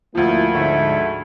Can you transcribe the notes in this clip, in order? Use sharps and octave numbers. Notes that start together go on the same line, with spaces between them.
D2 F3 A#3 E4
G#2 D3 A3